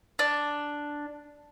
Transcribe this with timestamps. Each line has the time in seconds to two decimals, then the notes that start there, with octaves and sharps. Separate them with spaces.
0.19 D4